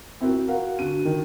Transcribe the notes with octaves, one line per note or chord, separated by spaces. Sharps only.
C4 E4 F#4 A#4
F#4 A#4 F5 F#5
D3 F#4 D#7
D#3